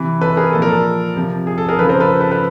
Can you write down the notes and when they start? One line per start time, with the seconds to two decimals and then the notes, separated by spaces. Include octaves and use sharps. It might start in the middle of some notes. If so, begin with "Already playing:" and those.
Already playing: C3 E3
0.21 A4 B4
0.37 G#4 A#4
0.53 A#2 F3 A4
0.62 A#4
0.68 A4
1.16 C3 F3
1.47 G#4
1.58 A4
1.69 G#4 A#4
1.79 F3 A4 B4
1.82 C#3
1.89 A#4 C5
2.00 A4 B4
2.21 A4 B4
2.32 A4 B4